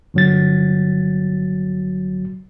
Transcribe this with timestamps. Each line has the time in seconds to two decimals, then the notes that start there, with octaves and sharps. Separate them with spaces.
0.14 G1 F#3 A6